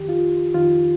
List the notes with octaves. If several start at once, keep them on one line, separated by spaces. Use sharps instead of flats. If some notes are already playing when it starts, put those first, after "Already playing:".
Already playing: F2 D#3 G4
F4
F2 D#3 F4